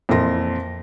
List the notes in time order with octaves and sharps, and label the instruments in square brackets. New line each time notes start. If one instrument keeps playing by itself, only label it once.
[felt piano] F2 A#2 E3 A#4 C6 A#6